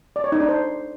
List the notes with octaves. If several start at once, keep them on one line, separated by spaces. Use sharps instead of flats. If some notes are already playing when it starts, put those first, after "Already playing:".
D5
C#5
D#4
D4
C5